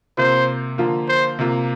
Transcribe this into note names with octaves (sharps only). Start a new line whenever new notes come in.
C3 A#3 F4 C5
D3 F3 A#3 F4
C5
C3 A#3 F4